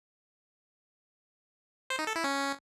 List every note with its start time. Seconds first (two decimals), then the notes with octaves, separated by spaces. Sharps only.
1.90 C5
1.99 D#4
2.07 A4
2.16 E4
2.24 C#4